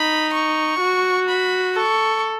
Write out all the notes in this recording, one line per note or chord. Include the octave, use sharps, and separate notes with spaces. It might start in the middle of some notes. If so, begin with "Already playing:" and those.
Already playing: D#4 B5
C#6
F#4
B5
A4 C#6